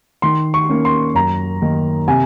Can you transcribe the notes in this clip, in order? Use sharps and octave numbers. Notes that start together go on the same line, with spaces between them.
D#3 C6
C#6
A#3 C#4
C6
F#2 A#5
D#3 A#3 D#4
C3 G#5